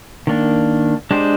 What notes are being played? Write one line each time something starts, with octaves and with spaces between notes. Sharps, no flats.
D#3 A#3 D4
G#3 D4 G4 C5